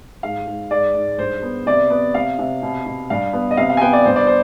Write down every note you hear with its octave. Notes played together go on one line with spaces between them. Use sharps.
G#2 F5
G#2
G#2 D5
G#2
G2 C5
B3
C3 D5
B3
C3 F5
C3
B2
B2
G2 F5
B3
D#5
C3 F5
F5
G#5
B3 G5
D5
G2 C5
D5
C5